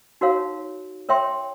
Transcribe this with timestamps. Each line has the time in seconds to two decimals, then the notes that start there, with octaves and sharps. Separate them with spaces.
0.21 D#4 F#4 A#4 C#5 F5
1.09 A#4 C#5 E5 G5 C6